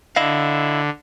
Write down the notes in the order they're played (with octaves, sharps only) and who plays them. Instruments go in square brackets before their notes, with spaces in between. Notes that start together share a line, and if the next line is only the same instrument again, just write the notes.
[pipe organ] D3 [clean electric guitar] E4 D#5 F5